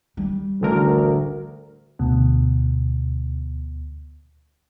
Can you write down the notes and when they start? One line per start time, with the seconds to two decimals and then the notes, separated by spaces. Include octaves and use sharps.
0.17 G3
0.61 A1 D2 D3 A#4
1.99 D2 B2